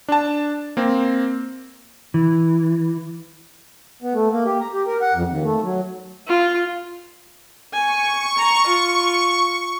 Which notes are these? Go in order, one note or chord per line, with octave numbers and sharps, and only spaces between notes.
D4 A5
A#3 C4
E3
B3
A3
A#3
G4
A#5
G4
A#4
F#5
F2
D#2
A3
F#3
F4
G#5 C#6
A#5
F4